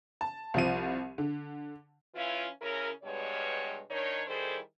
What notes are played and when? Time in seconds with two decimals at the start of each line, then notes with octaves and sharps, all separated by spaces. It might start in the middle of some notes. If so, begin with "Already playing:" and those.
0.21 A5
0.54 C2 F3 D#7
1.18 D3
2.15 E3 C#4 E4 F4
2.62 C#3 C#4 E4 A#4
3.03 G2 B2 G3 G#3 C#5
3.90 D#3 D4 D#4 C#5
4.27 D#3 G3 E4 G#4 A4 C5